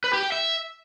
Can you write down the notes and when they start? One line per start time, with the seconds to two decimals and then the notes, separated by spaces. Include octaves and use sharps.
0.04 B4
0.13 G4
0.23 G5
0.32 E5